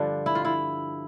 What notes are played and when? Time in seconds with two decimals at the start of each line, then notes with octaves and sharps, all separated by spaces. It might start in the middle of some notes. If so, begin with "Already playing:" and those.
Already playing: G2 D3 F3 D4
0.26 E4
0.35 F4
0.45 E4